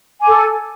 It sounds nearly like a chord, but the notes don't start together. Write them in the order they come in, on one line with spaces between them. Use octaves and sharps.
G#5 D6 A4